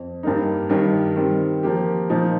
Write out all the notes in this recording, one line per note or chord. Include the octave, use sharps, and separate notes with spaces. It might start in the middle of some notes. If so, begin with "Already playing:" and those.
Already playing: F2
G2 G3 A#3 D#4
G2 D#3 G3
D#3 G3 C4
F3 A#3 G4
A#2 F3 D#4